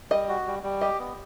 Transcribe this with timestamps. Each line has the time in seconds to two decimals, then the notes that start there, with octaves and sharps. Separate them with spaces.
0.10 G3 D#5
0.29 F#4
0.47 G3
0.63 G3
0.81 G4 D#5
0.99 B3